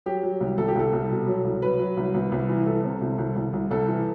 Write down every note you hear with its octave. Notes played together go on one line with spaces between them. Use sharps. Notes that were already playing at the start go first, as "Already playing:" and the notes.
F#3 G4
F#3
C2
C2 A4
G4
C2 A4
C2
B2
F#3
C2
F#3 B4
F#3
C2
C2
C2
E3
C2 A4
C3
C2
C2
C2
C2
C2 A4
E3